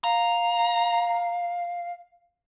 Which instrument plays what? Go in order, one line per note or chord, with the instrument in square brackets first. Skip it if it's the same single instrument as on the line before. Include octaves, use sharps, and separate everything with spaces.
[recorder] F5 [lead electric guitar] A#5